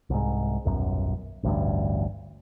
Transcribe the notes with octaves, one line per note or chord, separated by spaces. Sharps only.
C2 G#2
D#1 B1 F#2
A1 D2 G2